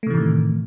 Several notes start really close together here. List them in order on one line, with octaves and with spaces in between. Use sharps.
A3 C3 E3 A2 D#3